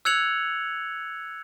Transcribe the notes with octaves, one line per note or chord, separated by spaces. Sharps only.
E6 F#6 G#6 C#7 F7 F#7